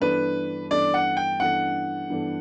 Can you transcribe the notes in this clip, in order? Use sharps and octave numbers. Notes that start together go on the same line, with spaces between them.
G2 E3 B3 D4 A4 B4
G2 E3 B3 D4 A4 D5
F#5
G5
G2 E3 B3 D4 A4 F#5
G2 E3 B3 D4 A4